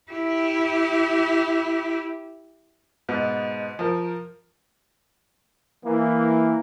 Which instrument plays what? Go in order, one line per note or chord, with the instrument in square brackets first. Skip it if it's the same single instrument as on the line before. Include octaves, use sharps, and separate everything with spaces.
[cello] E4 G4
[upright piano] G#2 B2 B3
F3 A#4
[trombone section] E3 A#3